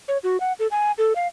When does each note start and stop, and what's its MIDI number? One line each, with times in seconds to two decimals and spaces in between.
0.08 0.18 73
0.23 0.40 66
0.40 0.53 78
0.59 0.67 69
0.71 0.92 80
0.98 1.13 69
1.16 1.27 77